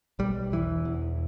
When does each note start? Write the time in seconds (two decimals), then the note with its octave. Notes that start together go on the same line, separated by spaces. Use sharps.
0.19 B1 G3
0.52 E1 E3
0.85 E2